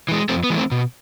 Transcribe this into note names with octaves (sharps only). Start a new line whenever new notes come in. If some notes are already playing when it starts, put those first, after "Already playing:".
E3 G#3
F2 A3 C4
B3
E3 G#3
A3 C4
B2